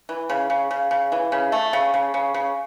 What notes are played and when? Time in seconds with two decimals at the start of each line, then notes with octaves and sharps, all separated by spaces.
0.09 E3
0.29 C#3
0.50 C#3
0.71 C#3
0.91 C#3
1.12 E3
1.32 C#3
1.52 A3
1.73 C#3
1.94 C#3
2.14 C#3
2.34 C#3